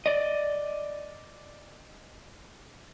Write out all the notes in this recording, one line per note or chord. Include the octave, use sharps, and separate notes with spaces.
D5 D#5